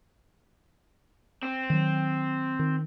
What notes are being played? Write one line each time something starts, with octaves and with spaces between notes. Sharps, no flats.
C4
D#3 F#3
D#3